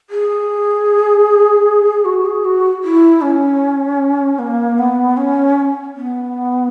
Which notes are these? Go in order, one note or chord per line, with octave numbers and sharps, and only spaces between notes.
G#4
F#4
G#4
F#4
E4
C#4
A#3
B3
C#4
B3